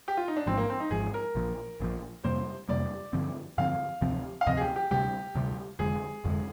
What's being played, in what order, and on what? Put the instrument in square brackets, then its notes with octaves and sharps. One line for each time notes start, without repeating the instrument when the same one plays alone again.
[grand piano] G4
F4
D#4
D4
[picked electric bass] G#1 G#2 F3 [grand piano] C4
[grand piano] A#3
C4
D#4
[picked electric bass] G#1 G#2 F3 [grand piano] G#4
[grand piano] A#4
[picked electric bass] A#1 A#2 F3
A#1 A#2 F3
[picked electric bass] F2 C3 G3 A#3 [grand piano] C5
[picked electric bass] F2 C3 G3 A#3 [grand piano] D5
[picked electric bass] G2 D3 F3 C4
[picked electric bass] G2 D3 F3 C4 [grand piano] F5
[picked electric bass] D2 C3 F3 C4
[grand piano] F5
[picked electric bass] D2 C3 F3 C4 [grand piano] D#5
[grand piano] G#4
G4
G4
[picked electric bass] D2 C3 G3 [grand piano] G4
[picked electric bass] D2 C3 G3
[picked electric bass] F1 F2 D3 G#3 [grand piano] G#4
[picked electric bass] F1 F2 D3 G#3